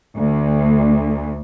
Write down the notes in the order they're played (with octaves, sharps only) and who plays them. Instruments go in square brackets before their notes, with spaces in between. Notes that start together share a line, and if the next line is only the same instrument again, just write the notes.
[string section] D2